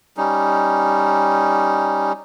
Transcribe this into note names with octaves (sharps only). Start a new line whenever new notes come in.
G3 C#4 D#4